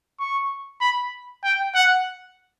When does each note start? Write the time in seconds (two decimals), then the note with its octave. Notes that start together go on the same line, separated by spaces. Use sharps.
0.19 C#6
0.81 B5
1.43 G5
1.75 F#5